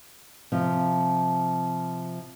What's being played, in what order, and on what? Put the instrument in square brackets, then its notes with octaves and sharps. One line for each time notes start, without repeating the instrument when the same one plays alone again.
[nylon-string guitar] C3 F3